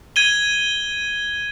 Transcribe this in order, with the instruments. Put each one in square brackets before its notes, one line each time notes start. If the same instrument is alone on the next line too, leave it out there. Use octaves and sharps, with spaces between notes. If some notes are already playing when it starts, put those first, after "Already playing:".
[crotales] G#6 D#7 G7